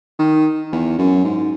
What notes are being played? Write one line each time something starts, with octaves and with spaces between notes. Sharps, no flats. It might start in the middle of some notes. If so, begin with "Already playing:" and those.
D#3
E2
F#2
G#2